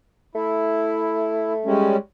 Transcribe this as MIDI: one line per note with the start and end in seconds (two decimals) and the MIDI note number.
0.35 1.95 57
0.35 1.53 64
1.65 1.97 55
1.65 1.97 56
1.65 1.97 61